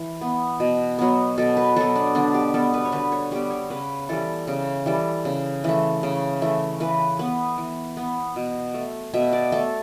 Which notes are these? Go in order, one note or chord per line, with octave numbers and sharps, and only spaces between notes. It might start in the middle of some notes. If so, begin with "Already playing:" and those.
Already playing: E3
B3
B2
F#3 B3
B2 A4
B4
F#3 B3 A4
D4
D3 D4
G4
G3 B3 A4
B4
C#5
D3 B4
C#5
G3 B3 G4
C#5
C#3 B4
E3 G3 A4
C#3
E3 G3 A4
C#3
E3 A3
C#3
E3 A3
E3 B4
B3 B4
E3
B3
B2
A3
B2 E5
D5
A3 A4